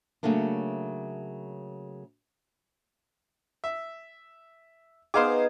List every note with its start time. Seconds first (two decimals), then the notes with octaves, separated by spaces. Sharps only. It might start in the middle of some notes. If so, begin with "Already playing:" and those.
0.23 C#3 F#3 A3 A#3 D4
3.64 E5
5.14 B3 D#4 G#4 C5 F5 D6